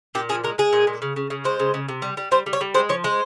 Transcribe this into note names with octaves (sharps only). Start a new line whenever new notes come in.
A#2 G4
F3 G#4
G#3 A#4
G#3 G#4
A#2
A#2
C#3
C#3
C#3
G#3 C5
C#3
C#3
C3
G3
G3
G3 C5
G3
C#5
G3
G#3 C5
F3 C#5
G#3 C5